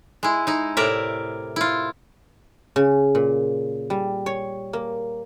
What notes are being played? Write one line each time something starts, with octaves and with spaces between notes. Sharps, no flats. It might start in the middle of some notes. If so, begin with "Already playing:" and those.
G#3 E4
D#4 E4
A2 C3 A#4 D5 E5
E4 F4
C#3
A#2
G3
C#5
A#3